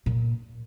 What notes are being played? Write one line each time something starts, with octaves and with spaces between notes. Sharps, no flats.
A#2